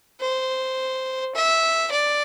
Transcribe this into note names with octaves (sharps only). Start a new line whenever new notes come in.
C5
E5
D5